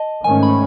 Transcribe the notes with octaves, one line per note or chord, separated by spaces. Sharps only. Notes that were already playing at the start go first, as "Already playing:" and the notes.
Already playing: D#5 A5
G#2 D#3 A3 C#4 G#5
B5